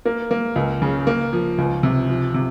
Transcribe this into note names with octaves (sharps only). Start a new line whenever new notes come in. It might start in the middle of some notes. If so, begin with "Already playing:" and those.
A#3
A#3
C#2
C#3
A#3
F3
C#2
C3
F3
C3